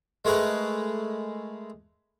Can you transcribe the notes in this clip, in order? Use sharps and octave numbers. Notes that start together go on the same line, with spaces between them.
G#3 A3 G#4 A#4 B4